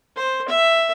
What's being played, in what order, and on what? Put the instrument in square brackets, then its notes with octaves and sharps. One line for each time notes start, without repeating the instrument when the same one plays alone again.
[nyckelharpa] C5
E5